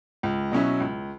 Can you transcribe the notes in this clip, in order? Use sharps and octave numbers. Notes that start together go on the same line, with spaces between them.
C#2
B2 F#3 C#4 E4
C#2